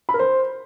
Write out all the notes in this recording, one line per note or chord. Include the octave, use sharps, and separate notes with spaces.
B5
A#4
C5